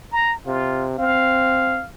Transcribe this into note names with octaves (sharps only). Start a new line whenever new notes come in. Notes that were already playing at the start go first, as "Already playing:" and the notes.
A#5
C3 F4
C4 F5